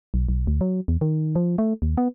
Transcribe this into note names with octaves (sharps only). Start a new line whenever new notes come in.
B1
B1
D2
F#3
E2
D#3
F3
A3
D#2
B3